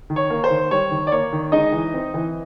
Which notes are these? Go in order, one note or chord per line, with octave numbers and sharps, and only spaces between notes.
D#3
C#5
A#3
C5
D#3
G3 C#5
D#3
D5
A#3 C#5
D#3
G#3 D#4 D#5
E3
C4
E3